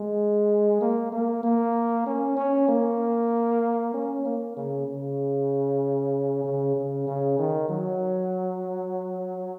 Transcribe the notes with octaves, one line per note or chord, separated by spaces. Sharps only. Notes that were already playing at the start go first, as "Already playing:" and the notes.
Already playing: G#3
A#3
A#3
A#3
C#4
C#4
A#3
C#4
A#3
C#3
C#3
C#3
C#3
C#3
D#3
F#3